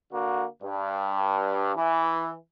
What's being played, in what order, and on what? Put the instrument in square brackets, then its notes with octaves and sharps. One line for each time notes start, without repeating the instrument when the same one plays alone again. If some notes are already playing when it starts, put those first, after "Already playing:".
[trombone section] D3 A#3 F#4
G2
E3